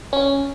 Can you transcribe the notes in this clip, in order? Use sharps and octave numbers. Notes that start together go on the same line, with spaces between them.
C#4